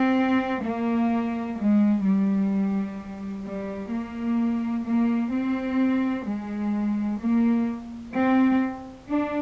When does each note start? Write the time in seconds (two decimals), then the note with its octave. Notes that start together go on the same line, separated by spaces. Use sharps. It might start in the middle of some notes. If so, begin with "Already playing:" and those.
Already playing: C4
0.64 A#3
1.57 G#3
2.05 G3
3.45 G3
3.92 A#3
4.86 A#3
5.33 C4
6.27 G#3
7.20 A#3
8.14 C4
9.08 D4